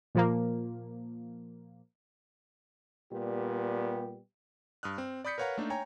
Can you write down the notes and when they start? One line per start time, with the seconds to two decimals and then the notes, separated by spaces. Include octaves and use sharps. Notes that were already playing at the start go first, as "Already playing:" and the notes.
0.15 A#2 F3 A#3
3.12 A#2 G3 B3 G4
4.83 G2 D#6 F6 F#6
4.98 C4
5.25 D5 B5 D#6 G6 B6 C#7
5.38 A#4 B4 C#5 F5 F#5 A#5
5.58 A3 A#3 D4 D#4
5.70 C#5 G5 G#5 A#5